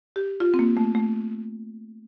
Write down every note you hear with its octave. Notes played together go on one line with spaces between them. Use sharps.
G4
F4
C4
A#3
A3
A3